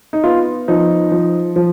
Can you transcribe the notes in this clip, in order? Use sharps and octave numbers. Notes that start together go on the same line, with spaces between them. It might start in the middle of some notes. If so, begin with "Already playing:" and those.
D#4
B3 F4
F3 D#4
F3
F3